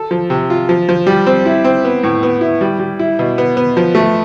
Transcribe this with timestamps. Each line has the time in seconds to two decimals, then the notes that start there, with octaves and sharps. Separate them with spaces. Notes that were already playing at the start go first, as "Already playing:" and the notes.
Already playing: A4
0.11 F3
0.30 C3
0.50 F4
0.69 F3
0.89 F3
1.07 G3
1.26 C4
1.46 E4
1.64 C4
1.85 B3
2.03 A2
2.23 B3
2.41 E4
2.61 G3
2.79 G3
2.99 E4
3.19 B2
3.38 B3
3.57 B3
3.77 F3
3.95 A3